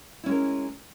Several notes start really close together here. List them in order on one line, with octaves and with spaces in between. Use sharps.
E4 C#4 G#3 A#4